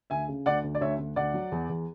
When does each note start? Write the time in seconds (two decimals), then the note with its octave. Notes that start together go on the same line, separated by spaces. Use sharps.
0.10 D2 E5 G#5
0.28 C#3
0.46 D2 D5 F#5
0.64 D2
0.75 D5
0.81 D2 C#5 E5
0.99 D2
1.16 D2 D5 F#5
1.34 F#3
1.52 E2
1.69 E2